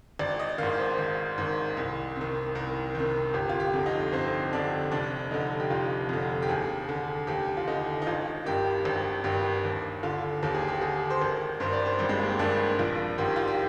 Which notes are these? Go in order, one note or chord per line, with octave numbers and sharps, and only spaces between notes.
G#1 D5
D#5
G#2 D#3 F5
C5
G#1
G#2 D#3
C2
C3
D#3
C2 A#4
C3 D#3
G1 G4
F4
G4
F2 D3
D#4
G1 C4
F2 D3 D4
F1 D4
F2 D3 D#4
G4
F1 F4
F2 D3
G4
D#2 G#4
D3
D#2 G4
F4
D3 D#4
D#4
G#1 F4
G2 D#3 G4
G#1 G4
G2 D#3 G4
D#2
D3 F4
D#2 G4
G#4
G4
D3 G#4
C5
G#1 A#4
G2 D#3 C5
D5
C5
G#1 G3
G#3
A#3
C4
G2 D#3 D4
A#1 F4
G#2 D#3 G4
F4
G4